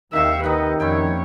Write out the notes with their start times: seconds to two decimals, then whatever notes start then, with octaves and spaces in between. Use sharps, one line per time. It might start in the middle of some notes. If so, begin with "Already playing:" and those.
0.13 D#2 C3 D#3 C4 E5 F5 C#6
0.44 D#3 D#4 B4 D#5 E5 F#5
0.80 F2 A#2 C#4 E4 C#5 G5